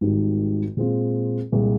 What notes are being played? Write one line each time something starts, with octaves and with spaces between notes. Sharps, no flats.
G#1 G#2 D#3 G3
A#2 G#3 C4 F4
C2 A#2 G#3